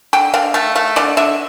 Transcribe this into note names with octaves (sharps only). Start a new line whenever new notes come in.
D3 G5
D3 F5
A3 F5
A3 F5
D3 D5
D3 E5